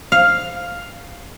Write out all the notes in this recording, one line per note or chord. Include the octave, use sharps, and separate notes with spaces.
F5